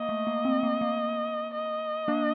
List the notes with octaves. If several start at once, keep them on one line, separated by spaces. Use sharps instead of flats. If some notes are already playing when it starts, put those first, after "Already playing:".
Already playing: A#3 D#5
A3
A#3
C4
A#3
A#3
D#5
A#3 D4